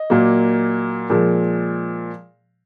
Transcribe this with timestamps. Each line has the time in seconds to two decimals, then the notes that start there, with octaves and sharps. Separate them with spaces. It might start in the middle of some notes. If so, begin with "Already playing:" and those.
Already playing: D#5
0.10 A#2 F#3 A#3
1.10 A#2 F3 G#3